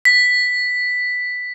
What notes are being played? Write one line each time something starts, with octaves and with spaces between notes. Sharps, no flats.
B6